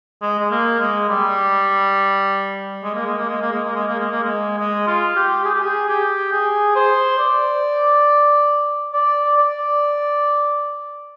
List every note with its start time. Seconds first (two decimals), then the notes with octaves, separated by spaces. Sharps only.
0.22 G#3
0.39 G#3
0.51 A#3
0.80 G#3
1.09 G3
2.84 G#3
2.94 A#3
3.07 G#3
3.18 A#3
3.29 G#3
3.41 A#3
3.53 G#3
3.64 A#3
3.76 G#3
3.87 A#3
4.00 G#3
4.11 A#3
4.23 G#3
4.58 G#3
4.87 F4
5.16 G4
5.45 G#4
5.54 G4
5.64 G#4
5.88 G4
6.32 G#4
6.76 C5
7.19 D5
8.93 D5
9.37 D5